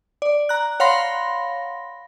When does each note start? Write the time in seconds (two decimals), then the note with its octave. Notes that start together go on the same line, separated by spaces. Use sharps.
0.22 D5
0.49 A#5 F#6
0.80 C#5 F5 F#5 B5 C6 A#6